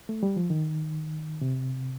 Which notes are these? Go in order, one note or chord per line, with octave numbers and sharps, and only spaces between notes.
A3
G3
F3
D#3
C3